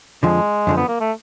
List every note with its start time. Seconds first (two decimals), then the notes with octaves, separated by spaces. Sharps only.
0.23 F2 D3 F3 G#3
0.67 F#2 D3 F3
0.77 B3
0.88 A#3
1.00 A3